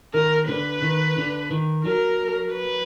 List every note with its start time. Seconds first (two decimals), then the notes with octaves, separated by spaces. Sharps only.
0.14 D#3 A#4
0.49 D3 B4
0.82 D#3
1.17 D3
1.51 D#3
1.85 F#3 A#4
2.53 B4